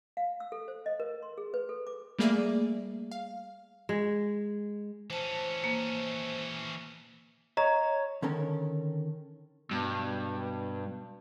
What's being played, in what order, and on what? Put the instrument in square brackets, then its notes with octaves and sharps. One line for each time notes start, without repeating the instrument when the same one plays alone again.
[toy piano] F5
E6
A4
C5
D#5
A#4
C6
G#4
B4
A4
D6
[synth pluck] G3 A3 A#3 G#4 D5 E5
F5
[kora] G#3
[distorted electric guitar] E3 C#4 [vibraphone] C5 A5
[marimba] A#3
[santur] C#5 [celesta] D#5 A#5
[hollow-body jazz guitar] D3 D#3 C#4 A4 A#4
[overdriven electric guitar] G2 [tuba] B2